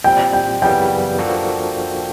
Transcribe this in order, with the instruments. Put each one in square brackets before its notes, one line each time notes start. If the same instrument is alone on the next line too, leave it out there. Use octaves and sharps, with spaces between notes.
[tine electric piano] A#2 G3 C4 [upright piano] G5
[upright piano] G5
[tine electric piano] F#2 C#3 E3 G3 B3 [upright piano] G5
[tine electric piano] F3 A#3 D4 F#4 A4